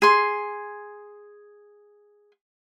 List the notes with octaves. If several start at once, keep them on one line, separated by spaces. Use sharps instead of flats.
G#4 C6